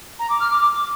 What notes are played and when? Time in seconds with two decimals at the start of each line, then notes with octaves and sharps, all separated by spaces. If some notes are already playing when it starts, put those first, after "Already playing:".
0.19 A#5
0.29 D6
0.40 F6
0.51 D6
0.61 D6